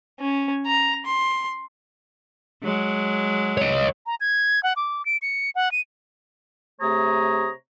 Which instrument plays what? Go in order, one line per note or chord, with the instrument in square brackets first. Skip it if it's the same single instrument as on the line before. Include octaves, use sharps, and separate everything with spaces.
[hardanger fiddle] C#4
A#5
C6
[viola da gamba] F#3 G#3
[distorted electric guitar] C#5 D#5
[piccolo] A#5
G#6
F#5
D6
D7
C#7
F#5
D#7
[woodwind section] C3 A3 G#4 C#5 A#5 D#6